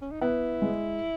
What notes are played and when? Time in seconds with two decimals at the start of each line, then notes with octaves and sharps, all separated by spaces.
0.01 C#4
0.11 D#4
0.21 B3 E4
0.62 G#3